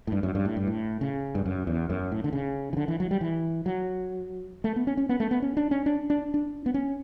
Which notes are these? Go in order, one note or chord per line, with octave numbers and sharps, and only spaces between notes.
A2
G2
F#2
G2
A2
G2
A2
C#3
G2
F#2
E2
F#2
A2
D3
C#3
E3
D3
E3
F#3
G3
E3
F#3
A3
B3
C#4
C#4
B3
A3
B3
C#4
D4
C#4
D4
D4
D4
B3
C#4